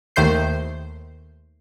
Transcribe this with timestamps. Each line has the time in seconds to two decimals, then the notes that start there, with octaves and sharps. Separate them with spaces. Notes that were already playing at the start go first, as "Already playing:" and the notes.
0.16 D#2 D#3 A3 C5 G6 C7